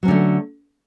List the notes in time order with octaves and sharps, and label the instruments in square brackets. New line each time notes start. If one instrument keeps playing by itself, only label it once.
[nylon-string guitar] F#3
C#4
D3
A3